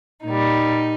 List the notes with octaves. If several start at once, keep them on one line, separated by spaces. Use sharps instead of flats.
A#2 G3 D#4